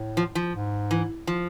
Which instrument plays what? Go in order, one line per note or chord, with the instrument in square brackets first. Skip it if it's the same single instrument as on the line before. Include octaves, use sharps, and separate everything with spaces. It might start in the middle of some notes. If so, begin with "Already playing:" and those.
Already playing: [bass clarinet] A2
[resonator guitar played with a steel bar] F3
F3
[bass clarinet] G#2
[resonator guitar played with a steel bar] E3
F3